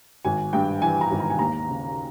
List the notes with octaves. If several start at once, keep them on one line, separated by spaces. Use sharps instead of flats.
G#1 G#5
G2 G5
E3 G#5
A#5
G#1
A#5
G#5
D#2 A#5
C#3